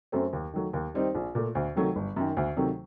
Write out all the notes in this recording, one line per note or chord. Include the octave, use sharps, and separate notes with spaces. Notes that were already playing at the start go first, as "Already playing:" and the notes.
F#2 F#3 A3 C4
D#2
D#3 F#3 A3
D#2
D#3 G3 C4 D#4
A#1
A#2 A3
D2
C3 D#3 F#3 A3
G1
F#2 D#3
D2
C3 D#3 F#3 A3